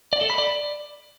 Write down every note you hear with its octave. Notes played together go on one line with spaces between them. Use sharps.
D5
A4
B5
D5